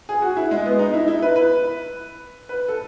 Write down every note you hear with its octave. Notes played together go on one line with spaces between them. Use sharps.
G#4
F#4
E4
G#3
B3
D#4
E4
E4
B4
B4
B4
A4